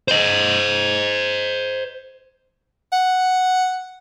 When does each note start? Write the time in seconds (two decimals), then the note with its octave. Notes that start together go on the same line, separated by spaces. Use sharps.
0.08 C5 D#5
2.93 F#5